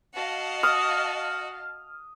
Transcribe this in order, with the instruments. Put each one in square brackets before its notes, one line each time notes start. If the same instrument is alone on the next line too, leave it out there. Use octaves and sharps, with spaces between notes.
[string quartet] F#4 [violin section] D#5 F5 A5
[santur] D#6 [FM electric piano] F6